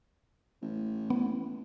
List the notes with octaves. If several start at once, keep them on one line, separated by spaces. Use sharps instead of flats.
A1
B3